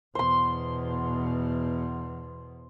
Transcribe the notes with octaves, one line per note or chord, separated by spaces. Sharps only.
E2 B2 C5 C6